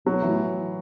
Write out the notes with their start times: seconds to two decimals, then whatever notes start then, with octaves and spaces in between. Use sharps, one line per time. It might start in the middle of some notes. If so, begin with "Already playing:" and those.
0.06 B2 F#3
0.22 E3
0.28 A2